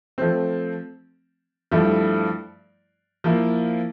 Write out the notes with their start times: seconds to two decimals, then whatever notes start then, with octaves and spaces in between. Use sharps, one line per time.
0.18 F3 A3 C4
1.71 G2 F3 A3 E4
3.24 F3 A#3 E4